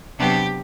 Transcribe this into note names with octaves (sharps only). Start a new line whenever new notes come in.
C3 F#3 B3 D4 G4